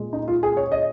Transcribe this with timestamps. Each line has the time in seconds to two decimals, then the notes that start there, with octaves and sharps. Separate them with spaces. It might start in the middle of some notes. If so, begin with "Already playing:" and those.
Already playing: A#2 G#3
0.13 D#4
0.28 F4
0.43 G#4
0.57 C#5
0.72 D#5